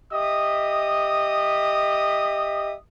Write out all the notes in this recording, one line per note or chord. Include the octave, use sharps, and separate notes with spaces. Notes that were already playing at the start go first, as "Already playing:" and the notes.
G4 D#5 E5 D#6